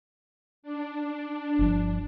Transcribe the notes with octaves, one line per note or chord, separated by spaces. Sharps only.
D4
G1 F3